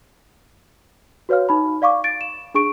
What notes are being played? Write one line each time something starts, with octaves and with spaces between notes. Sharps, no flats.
F#4 B4 C#5 F5 F6
D#4 B5
D5 F5 C#6 D6
A6 D7
E7
D4 G#4 C#6 D7